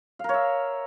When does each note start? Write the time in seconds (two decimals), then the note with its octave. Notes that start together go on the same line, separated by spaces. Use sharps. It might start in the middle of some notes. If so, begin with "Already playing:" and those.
0.19 F5
0.24 A#4
0.29 C#5
0.34 E5